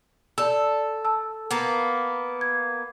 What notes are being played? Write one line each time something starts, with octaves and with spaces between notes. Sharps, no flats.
A4 D5 E6
A5 E6
A#3 B3
G#6